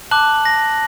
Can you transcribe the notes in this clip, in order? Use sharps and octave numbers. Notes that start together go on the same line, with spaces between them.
A5 D6 F#6 F#7
A#6